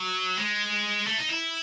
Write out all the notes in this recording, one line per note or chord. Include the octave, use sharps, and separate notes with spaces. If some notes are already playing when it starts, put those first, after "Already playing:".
Already playing: F#3
G#3
A3
D#4
E4